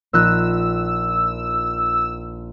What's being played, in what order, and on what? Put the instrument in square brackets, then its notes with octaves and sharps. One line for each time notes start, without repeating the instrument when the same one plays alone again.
[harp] A#1 D#4 F#6 [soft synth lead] E6